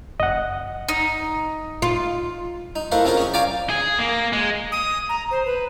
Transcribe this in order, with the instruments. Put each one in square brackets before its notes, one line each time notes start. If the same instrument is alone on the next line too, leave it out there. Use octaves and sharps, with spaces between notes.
[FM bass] F#1 [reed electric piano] D#5 F#5
[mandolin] D#4
[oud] F4
[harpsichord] D#4
A3 E4 A#4 C5 F5 F#5
C4 C#4 F4 G#4 A#4 C5
C#4 G#4 C#6
D5 F5 G5 G#5 A#5 D6
[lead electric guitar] G#4
A#3
G#3
[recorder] D#6
A#5
C5
B4